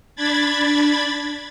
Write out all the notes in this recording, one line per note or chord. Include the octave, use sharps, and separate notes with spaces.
D4 B5 G#6 A6